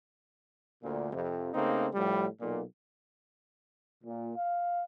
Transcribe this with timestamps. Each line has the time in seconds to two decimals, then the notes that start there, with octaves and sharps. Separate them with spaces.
0.83 D2 A#2
1.12 F2 C3
1.54 C#3 A3 A#3 C4 D#4
1.94 A2 F3 G3
2.40 B1 A#2
4.03 A#2
4.36 F5